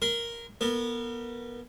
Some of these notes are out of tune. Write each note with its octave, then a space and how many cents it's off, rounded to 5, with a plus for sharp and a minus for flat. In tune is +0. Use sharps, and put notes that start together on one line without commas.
A#4 +0 C6 -45
B3 -25 A#4 -35